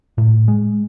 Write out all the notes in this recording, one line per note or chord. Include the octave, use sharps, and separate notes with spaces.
A2
G#3